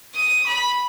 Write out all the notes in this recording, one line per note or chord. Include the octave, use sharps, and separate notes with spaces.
D#6
B5